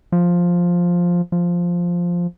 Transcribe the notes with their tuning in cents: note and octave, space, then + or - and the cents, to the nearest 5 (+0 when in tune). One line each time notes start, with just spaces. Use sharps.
F3 +5
F3 +0